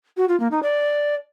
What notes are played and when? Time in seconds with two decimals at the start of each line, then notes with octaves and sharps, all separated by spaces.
0.17 F#4
0.28 F4
0.40 A#3
0.51 D#4
0.63 D5